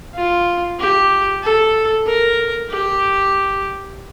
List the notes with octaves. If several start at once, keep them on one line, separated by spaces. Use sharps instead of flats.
F4
G4
A4
A#4
G4